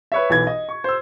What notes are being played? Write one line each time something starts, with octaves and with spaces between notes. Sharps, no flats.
B4 C#5 E5
B1 E3 G#6
D#5
C#6
C5 E6